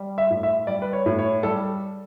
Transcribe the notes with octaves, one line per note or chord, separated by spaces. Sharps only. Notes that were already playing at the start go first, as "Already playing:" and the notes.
Already playing: G3
E5
A2
E5
G3 D5
B4
C#5
A2
C#5
G3 A4